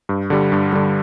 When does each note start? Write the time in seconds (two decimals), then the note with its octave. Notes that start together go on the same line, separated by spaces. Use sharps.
0.09 G2
0.30 D3 G3
0.52 G2
0.73 D3 G3